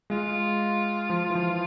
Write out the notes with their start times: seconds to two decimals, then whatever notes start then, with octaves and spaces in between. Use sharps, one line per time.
0.10 G#3 F4
1.10 F3
1.30 E3
1.35 F3